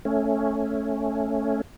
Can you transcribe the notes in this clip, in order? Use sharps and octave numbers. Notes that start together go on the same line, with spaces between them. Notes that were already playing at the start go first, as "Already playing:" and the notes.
A3 C#4